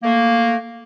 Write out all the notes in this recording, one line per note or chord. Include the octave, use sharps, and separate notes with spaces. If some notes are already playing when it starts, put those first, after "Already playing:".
A3 A#3